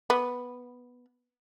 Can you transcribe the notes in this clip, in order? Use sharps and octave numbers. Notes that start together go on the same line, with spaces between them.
B3